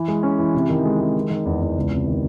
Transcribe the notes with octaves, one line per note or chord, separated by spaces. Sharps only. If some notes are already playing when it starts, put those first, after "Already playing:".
Already playing: E3
G#3
C#4
E3
C3
D#3
G#3
G#3
D#3
D#3
E2
E2
C#2
C3
D#3